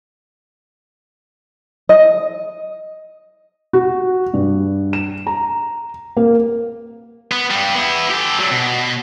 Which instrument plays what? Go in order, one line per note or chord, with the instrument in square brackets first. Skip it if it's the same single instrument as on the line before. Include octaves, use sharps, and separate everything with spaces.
[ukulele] D#5
[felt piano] F#4
G2
E7
A#5
A#3
[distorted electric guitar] B3
G2 G3
B3 E4
G4 A4
F#3 G3
B2